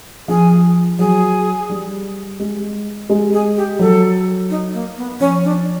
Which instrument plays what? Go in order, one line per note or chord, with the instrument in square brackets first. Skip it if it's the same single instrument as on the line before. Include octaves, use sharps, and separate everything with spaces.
[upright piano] F3 [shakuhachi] G#4
[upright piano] F#3 [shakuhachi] G#4
[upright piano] G3
G#3
G#3
[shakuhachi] G#4
G4
[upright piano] F#3 [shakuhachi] A4
[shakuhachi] D#4
A#3
B3
[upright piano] F3 [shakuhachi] C#4
[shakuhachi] D4